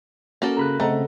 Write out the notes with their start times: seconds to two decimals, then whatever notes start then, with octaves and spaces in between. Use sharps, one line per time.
0.42 A#3 C#4 F#4 A4
0.57 C#3 A#5 B5 F#6
0.80 C#3 A3 C4 A4 D#5 F#5 A#5